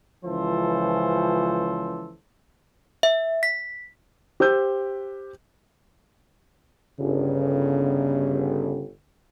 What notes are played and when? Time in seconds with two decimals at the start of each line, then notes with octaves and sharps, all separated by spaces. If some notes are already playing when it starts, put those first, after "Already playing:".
0.25 C#2 E3 F3 C#4 A4 C5
3.03 E5
3.43 B6
4.40 G4 C5 E6 G6
6.99 G1 C#3